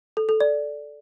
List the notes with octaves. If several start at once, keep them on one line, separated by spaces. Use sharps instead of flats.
A4
A4
D5